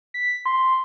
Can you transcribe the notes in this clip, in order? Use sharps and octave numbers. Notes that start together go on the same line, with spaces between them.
B6
C6